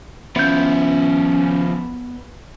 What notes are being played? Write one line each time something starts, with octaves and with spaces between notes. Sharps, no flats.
F3 B3 C#4 E4 G6